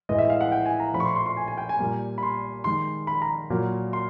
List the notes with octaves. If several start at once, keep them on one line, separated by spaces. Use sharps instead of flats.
A2 E3 G#3 D#5
E5
F5
F#5
G5
G#5
A#5
A#2 F3 A3 B5
C#6
C6
C6
C6
G#5
G#5
G5
G#5
A#2 G3 A#3
B5
C6
D#3 G#3 C6
B5
A#5
A#2 F#3 A#3
C6